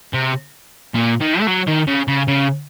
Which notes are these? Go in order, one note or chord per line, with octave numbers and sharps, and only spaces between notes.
C3
A#2
D#3
A3
F#3
D#3
C#3
C#3
C#3